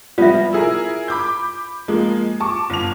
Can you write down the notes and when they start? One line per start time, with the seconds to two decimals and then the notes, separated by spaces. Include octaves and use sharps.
0.18 F3 G3 B3 F4 E5
0.53 E4 G#4 A#4
1.08 B5 D6 G6
1.88 F3 G#3 A#3
2.40 A5 C#6 D6
2.70 G1 F7